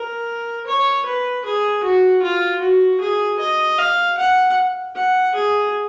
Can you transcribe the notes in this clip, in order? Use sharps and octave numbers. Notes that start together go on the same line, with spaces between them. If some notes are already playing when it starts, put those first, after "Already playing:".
Already playing: A#4
C#5
B4
G#4
F#4
F4
F#4
G#4
D#5
F5
F#5
F#5
G#4